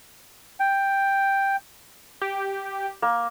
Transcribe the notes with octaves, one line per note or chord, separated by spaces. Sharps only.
G5
G4
A#3